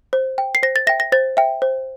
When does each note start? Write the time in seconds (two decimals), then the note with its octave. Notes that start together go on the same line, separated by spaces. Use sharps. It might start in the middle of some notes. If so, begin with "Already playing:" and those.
0.13 C5
0.38 G5
0.55 C7
0.63 C5 A#6
0.76 A6
0.87 E5 G5 A#6
1.00 A#6
1.12 C5 A6
1.37 E5 G5
1.62 C5